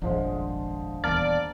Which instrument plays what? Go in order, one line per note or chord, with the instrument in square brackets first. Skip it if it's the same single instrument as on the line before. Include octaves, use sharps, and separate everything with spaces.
[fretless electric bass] D#1 G#1 F2 [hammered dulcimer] D3 F3 G#3
[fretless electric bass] D#1 E2 [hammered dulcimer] A#3 [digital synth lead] D5 [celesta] A5 F6